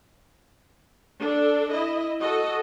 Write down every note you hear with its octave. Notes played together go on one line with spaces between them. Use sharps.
D4 A4
E4 D#5
F#4 A4 D#5